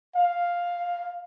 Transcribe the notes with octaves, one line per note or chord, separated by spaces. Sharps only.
F5